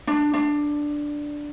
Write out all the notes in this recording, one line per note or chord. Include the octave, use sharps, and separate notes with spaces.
D4
D4